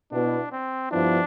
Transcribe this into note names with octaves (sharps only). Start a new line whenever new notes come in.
B2 B3 D4 E4
C4
G2 F3 B3 D4 E4